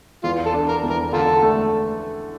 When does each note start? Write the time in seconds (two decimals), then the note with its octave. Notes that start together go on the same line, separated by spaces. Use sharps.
0.24 E2 F4
0.46 A4
0.54 D4
0.68 A#4
0.83 E2
0.90 A#4
1.12 D3 F4 A4
1.43 A3